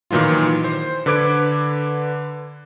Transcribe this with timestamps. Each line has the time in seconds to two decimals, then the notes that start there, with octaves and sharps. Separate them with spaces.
0.11 A#2 D#3 E3 F#3 F4
0.64 C5
1.06 D3 B4 D6 G#6 D7